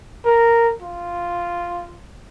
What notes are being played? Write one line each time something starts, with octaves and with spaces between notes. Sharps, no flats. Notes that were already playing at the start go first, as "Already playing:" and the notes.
A#4
F4